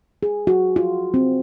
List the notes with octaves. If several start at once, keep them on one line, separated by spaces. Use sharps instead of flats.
G#4
F#4
F4
C4